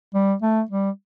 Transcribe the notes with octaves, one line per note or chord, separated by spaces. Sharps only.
G3
A3
G3